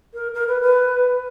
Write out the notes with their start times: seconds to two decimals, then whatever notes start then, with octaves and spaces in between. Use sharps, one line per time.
0.14 A#4
0.34 A#4
0.48 B4
0.62 B4